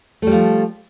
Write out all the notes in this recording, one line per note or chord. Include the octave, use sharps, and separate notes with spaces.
F3 G3 A3